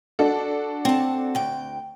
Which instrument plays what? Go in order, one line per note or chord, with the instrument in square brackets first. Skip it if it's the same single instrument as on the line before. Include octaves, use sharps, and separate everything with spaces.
[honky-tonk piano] D4 F#4 A4
[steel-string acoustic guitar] C4 A5
D2 G5